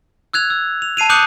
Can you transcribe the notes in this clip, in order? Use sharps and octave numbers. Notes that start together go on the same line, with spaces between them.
E6 F#6 G#6 F7
E6
F7
A5 C7 D#7 F7
D6 D#6 F#6 G6 C#7 F#7